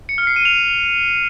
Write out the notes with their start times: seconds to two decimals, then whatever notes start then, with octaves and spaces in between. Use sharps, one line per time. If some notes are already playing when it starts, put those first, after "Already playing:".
0.09 C#7
0.18 F6
0.27 C7
0.36 D#7
0.45 F7